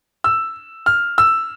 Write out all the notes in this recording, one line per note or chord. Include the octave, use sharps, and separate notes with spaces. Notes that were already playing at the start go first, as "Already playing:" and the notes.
E6
F6
E6